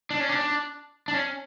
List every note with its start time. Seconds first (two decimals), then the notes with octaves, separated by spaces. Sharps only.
0.11 D4
0.20 C#4
0.29 D4
1.08 D4
1.14 C#4